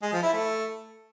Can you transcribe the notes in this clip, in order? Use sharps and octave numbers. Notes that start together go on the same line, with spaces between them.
G#3
F3
E4
A3